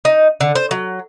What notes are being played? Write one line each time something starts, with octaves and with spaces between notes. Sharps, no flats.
D#4
D3
C5
F#3